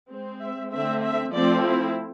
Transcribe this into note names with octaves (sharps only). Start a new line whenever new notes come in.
G#3 C4
E5
D3 A3 C4 E5
E5
F3 A3 C4 D5
E4